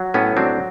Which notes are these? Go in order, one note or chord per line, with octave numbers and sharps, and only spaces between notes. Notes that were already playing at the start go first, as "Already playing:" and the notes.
Already playing: F#3
A2 B3 C#4
F#3 C4 D4